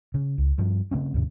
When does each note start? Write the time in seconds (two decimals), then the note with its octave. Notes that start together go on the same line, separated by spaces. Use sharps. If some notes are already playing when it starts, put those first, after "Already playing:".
0.14 C#3
0.38 C#2
0.58 G2 F3
0.91 C#3 A3 C4 C#4
1.14 D#2 G#2 C3